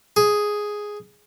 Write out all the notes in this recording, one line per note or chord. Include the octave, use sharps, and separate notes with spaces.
G#4